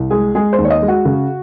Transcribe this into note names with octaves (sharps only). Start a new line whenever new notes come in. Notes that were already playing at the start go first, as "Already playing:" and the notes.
Already playing: C2
G#3 G#4
G#3 G#4
C5
D#2
C#5
D#5
G#3
F#4
C#3